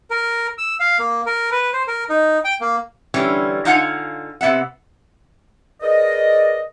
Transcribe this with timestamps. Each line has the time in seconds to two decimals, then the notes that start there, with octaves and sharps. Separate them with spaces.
0.11 A#4
0.58 E6
0.80 F5
0.99 A#3
1.26 A#4
1.52 B4
1.73 C5
1.88 A#4
2.09 D#4
2.45 G5
2.61 A#3
3.14 D3 E3 G3 C#4
3.65 D3 D#4 F4 F5 F#5 G#5
4.41 C3 B3 E5 F#5
5.82 G#4 A#4 B4 D5 D#5